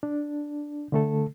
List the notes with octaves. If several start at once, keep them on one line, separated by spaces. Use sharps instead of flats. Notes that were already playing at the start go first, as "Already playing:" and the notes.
D4
D3 A3 A4